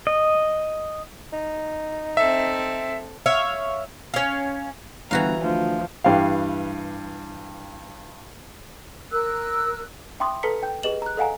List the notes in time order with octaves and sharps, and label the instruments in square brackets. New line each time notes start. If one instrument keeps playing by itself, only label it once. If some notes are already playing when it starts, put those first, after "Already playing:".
[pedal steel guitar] D#5
[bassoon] D#4
[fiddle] C4 A4 [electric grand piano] E5
[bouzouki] C#5 E5 F5
C#4 F5
[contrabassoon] G1 [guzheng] E3 F#4 F5 [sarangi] A#5
[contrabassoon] D2 [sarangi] F3
[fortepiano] G2 E3 G4 F5
[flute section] A#4 E6 F#6
[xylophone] E5 G5 B5 C6 D6 D#6
A4 B4 A5 A#5 B6 C#7
G5 G6
G4 G#4 B4 D#5 E7 F#7
A#5 F#6
A4 D#5 F5 F#5 G#5 A#5